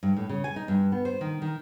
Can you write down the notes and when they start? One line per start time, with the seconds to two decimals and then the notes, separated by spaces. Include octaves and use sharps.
0.03 G2
0.17 A2
0.29 C#3
0.44 G#5
0.56 D#4
0.68 G2
0.92 B3
1.05 C5
1.21 D#3
1.42 D#3